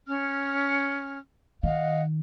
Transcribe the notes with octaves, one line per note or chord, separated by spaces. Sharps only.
C#4 F6
D#3 D#5 F5 F#5